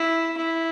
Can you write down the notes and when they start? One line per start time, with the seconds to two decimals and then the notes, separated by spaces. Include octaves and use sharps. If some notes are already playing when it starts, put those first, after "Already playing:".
Already playing: E4
0.37 E4